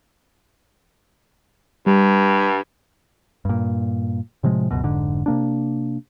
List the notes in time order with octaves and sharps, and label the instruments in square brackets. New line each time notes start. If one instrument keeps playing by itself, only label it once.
[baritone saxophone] G2 [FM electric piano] G3
[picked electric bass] G2 A#2
A2 C3 F3 G#3
C#2 F#2 B2
F1 G#2 D3
C3 A#3 D4